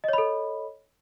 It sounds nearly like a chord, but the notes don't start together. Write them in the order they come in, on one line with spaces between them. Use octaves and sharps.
D#5 C#5 B5 A4